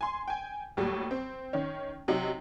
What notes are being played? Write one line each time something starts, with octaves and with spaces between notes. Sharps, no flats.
G#5 C6
G5 G#5
D#2 A2 F#3 G3
C4
D#3 C#4
C3 F#3 D#4